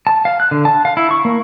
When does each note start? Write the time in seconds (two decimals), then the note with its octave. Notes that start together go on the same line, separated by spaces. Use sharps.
0.07 A5
0.25 F5
0.40 F#6
0.51 D3
0.65 A5
0.85 F5
0.97 E4
1.11 C#6
1.25 A#3